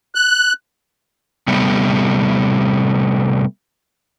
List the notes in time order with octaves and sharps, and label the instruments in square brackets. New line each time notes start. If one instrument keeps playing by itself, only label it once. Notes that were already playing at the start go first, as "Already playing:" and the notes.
[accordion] F#6
[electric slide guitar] C3 G3 A3 B3